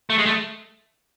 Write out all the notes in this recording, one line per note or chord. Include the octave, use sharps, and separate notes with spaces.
A3
G#3
A3